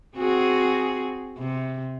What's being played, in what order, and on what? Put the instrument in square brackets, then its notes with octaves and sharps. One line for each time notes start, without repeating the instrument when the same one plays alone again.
[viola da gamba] C4 F#4 G#4
C3